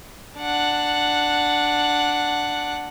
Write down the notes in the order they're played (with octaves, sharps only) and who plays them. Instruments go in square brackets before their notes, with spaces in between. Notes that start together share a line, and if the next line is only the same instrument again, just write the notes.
[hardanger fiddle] D4 F#5